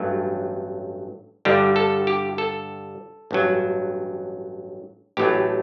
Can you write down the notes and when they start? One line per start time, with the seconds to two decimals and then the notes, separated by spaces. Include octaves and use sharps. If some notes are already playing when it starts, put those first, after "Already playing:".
Already playing: A1 G2 F#3 A3
1.45 G2 D3 G3 G4
1.76 A4
2.07 G4
2.38 A4
3.31 A1 G2 F#3
5.17 A1 A2 F#3 A3 G4